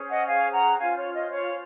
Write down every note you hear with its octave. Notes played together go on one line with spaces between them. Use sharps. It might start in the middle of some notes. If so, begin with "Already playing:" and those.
Already playing: C#4 G#4 C5
D#5 F#5
F5 G#5
F#5 A#5
C#4 F4 C5 F5 G#5
C#5
D#5
C#5 F5